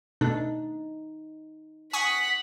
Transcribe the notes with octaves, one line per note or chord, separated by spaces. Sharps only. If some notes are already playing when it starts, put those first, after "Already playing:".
B2 A3 D4 D#4
F#5 G#5 C#6 D#6 B6